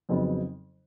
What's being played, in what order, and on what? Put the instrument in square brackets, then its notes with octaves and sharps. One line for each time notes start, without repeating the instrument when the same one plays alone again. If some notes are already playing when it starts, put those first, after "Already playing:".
[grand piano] F2 C#3 F#3 B3 D#4